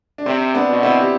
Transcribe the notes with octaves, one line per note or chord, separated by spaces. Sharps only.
D4
C3 C4
B3 D4
B2
C4 E4
G4